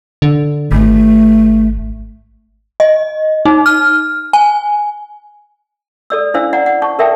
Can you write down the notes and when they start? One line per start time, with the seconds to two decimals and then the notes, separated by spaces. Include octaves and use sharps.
0.22 D3
0.72 G#1 A3
2.80 D#5
3.45 D#4
3.66 F6
4.33 G#5
6.10 A4 D5 E6
6.34 C#4 D4 E4 C5 F5 E6
6.53 D5 F#5 A#5
6.66 F#5
6.82 A5 C#6
6.99 A4 A#4 D5 E5 G5 A5